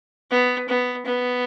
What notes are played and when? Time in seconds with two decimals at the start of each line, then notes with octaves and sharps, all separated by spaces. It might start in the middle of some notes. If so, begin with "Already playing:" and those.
0.31 B3
0.69 B3
1.06 B3